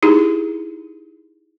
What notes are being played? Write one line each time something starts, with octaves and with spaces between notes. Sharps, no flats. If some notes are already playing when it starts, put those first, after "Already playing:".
D#4 E4 G4 G#4